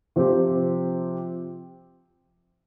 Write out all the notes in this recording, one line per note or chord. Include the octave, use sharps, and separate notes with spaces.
C3 F3 C4 G4